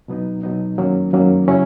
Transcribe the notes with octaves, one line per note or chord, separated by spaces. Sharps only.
B2 F#3 B3 D#4
B2 F#3 B3 D#4
F#2 D#3 F#3 A#3 C#4
F#2 D#3 F#3 A#3 C#4
C#3 F#3 C#4 E4